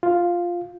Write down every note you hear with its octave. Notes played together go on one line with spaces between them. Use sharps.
F4